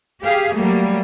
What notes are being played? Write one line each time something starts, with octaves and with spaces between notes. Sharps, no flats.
G4 G#4 F5
F#3 G3 A3 A#3